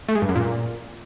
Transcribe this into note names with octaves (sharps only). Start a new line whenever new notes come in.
A3
G#3
G2
F#2
A#2